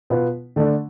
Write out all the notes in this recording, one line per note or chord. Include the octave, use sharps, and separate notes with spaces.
B2 B3 F4 B4
D3 A3 D4